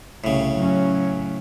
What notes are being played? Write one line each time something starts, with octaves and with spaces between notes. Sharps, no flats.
C2 A2 C#3
F#3 C#4